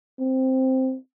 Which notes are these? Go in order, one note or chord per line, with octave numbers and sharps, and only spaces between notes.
C4